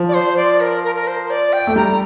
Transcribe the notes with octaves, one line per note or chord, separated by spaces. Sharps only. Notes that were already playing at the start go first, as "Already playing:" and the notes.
Already playing: F3
D5
C5
D5
A#4
A#4
A#4
C5
D5
G5
A3
G3 A#5